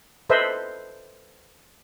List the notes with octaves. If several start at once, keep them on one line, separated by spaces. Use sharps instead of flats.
A4 B4 C5 D#5 E5